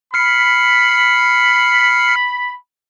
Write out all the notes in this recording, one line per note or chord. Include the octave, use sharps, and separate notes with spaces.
B5 F6 C7 C#7